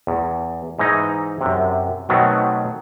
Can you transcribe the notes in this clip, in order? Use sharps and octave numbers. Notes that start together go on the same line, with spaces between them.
E2
G#2 E3 D#4 D#5 G#5 A#5
F#2 C3
B2 D#3 F#3 A3 B3 C4